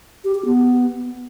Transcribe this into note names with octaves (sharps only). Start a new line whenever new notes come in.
G4
G4
B3